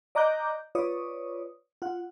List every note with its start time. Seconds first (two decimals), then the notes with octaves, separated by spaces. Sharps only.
0.15 D5 D#5 A#5 D6 F#6 G6
0.75 F4 B4 C#5 D5 D#6
1.82 F4 F#5